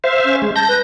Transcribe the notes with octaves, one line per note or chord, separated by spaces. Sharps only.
C5 E5 F5
C#4
G#3
A5 G6 A#6
B4